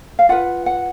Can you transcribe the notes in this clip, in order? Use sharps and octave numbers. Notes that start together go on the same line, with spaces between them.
F5
F4 B4 F#5
F#5